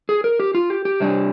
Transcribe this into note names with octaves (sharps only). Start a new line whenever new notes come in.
G#4
A#4
G4
F4
G4
G4
C3 G3 D4